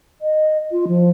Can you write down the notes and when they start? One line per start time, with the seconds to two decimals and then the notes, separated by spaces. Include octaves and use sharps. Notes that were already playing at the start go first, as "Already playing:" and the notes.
0.21 D#5
0.71 F4
0.88 F3